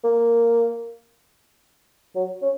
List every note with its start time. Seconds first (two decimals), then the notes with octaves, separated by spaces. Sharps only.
0.04 A#3
2.15 F#3
2.42 C#4